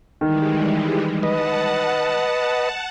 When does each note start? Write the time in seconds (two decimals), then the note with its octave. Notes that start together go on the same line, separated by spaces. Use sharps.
0.21 D#3 E3 G3 G#3
1.23 B4 D#5 F#5 A5